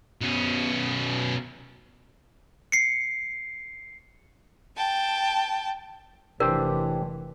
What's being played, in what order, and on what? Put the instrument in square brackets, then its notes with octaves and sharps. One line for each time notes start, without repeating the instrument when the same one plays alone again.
[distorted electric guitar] B2 C#4
[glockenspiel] C7 C#7
[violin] G5 A5
[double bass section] F1 E3 [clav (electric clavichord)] D4 G4 C5 [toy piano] A#4